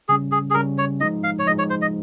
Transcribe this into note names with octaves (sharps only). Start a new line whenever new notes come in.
C#3 G3 C#4 G#4
G#4
G#4
C#3 G3 C#4 A#4
C#5
F3 G#3 D#4 D#5
F5
C#5
F3 G#3 D#4 D#5
C#5
C5
D#5